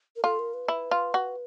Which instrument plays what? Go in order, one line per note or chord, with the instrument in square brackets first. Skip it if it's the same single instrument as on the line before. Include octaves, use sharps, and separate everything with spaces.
[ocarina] A#4
[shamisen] F4 [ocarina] A4
[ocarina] A#4
B4
[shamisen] E4
F4
F#4